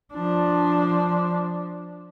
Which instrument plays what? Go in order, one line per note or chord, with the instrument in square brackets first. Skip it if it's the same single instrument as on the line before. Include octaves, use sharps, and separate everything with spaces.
[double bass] F3 D4